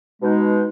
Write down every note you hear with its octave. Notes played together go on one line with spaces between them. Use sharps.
B2 G#3 D#4